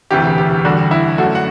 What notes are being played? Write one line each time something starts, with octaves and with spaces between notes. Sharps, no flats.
E1 D2 C3 E3 G4
G4
E2 D3 G3 F#4
E4
F#2 D3 A3 F#4
F#5